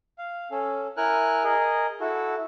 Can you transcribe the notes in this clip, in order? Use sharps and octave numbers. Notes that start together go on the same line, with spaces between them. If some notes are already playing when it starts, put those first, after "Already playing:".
F5
C#4 A4
E4 A#4 G#5 F6 F#6
G#4 A#4 D#5
E4 F#4 A4